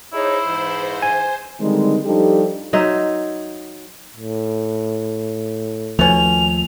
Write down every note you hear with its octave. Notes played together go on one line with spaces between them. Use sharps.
D#4 E4 G#4 C5 C#5
G#2 E3
G#5
D3 D#3 G3 G#3 C4 D#4
F3 G3 D4 D#4 G4 A4
F#3 D#4 C5 E5
A2
D#2 B2 F3 A3 C#4 F7